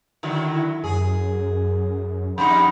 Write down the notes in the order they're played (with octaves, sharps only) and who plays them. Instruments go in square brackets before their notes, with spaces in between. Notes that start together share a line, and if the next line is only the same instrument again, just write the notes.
[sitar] D3 D#3 F#3 [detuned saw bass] E4
[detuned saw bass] F#2 [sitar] G#4
[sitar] F2 G3 D#4 [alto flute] B5